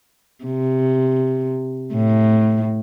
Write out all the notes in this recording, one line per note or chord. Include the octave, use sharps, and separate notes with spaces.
C3
A2